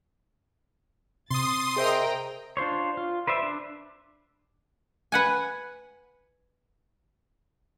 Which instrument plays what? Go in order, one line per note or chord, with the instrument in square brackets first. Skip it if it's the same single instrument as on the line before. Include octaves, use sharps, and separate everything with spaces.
[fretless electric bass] C3 [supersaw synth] C6 D#6 [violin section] A6
[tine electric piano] G#4 C5 E5 [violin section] A#4 D#5 G5
[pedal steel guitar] D4 F4 C5 C#5
F4
B4 C5 D5 E5
D4
[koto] B4 F#5 G#5